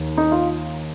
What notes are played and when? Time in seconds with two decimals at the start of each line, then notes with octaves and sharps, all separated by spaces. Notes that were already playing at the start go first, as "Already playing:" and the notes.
Already playing: D#2 D#3
0.18 D#4
0.32 F4